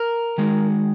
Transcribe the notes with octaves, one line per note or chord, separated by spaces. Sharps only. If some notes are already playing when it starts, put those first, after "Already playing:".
Already playing: A#4
D#3 G#3 D#4 F#4